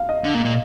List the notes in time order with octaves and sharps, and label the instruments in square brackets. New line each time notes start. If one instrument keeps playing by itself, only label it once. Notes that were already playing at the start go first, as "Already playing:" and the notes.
Already playing: [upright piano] F5
D#5
[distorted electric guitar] D3
A#2
A#2